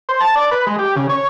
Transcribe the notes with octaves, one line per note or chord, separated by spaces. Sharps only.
C5
A5
D5
B4
G#3
G4
C#3
C#5